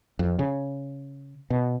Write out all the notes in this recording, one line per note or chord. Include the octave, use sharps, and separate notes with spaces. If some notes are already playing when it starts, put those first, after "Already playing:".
F2
C#3
B2